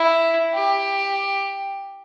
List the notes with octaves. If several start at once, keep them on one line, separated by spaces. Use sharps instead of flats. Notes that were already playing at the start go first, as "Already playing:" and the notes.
Already playing: E4
G4